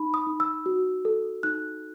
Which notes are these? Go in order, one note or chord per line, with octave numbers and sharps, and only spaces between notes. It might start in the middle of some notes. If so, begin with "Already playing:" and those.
Already playing: D#4 B5
D#6
D#4
E6
F#4
A4
D#4 F#6